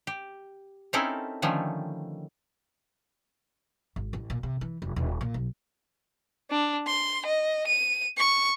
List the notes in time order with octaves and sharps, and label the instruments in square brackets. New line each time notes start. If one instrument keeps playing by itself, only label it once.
[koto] G4
C4 C#4 D#4 E4 A4 A#4
D3 D#3 F3 G3 A3 C#4
[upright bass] G#1
A1
A#2
C3
E3
F1
D#1
A#2
B1
[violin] D4
C6
D#5
D#7
C#6